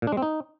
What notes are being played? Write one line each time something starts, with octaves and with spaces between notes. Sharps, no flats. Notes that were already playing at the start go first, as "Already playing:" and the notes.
A#2
D4
G#3
C4
D#4